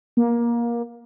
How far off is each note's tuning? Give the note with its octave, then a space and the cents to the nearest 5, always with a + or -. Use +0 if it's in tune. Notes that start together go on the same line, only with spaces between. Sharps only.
A#3 +20